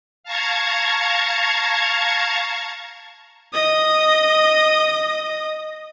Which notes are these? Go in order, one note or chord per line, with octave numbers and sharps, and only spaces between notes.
F5 A5 A#5 C#6 G#6
D#5 D#6